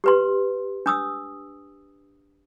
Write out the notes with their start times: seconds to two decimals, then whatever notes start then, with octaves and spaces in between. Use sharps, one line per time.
0.04 G4 B4 C6
0.86 D4 D#6 E6